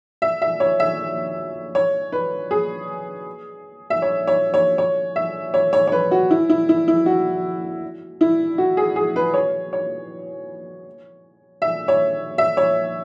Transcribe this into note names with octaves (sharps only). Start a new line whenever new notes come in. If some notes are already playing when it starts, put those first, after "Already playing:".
E5
E5
C#5
E5
C#5
B4
G#4
E5
C#5
C#5
C#5
C#5
E5
C#5
C#5
C#5
B4
F#4
E4
E4
E4
E4
F#4
E4
F#4
G#4
G#4
B4
C#5
C#5
E5
C#5
E5
C#5